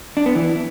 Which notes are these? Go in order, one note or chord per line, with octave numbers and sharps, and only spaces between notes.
D4
B3
E3